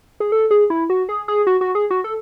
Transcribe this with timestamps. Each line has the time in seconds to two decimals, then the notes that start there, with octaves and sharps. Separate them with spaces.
0.20 G#4
0.32 A4
0.51 G#4
0.70 E4
0.90 F#4
1.09 G#4
1.28 G#4
1.47 F#4
1.61 F#4
1.75 G#4
1.90 F#4
2.04 A4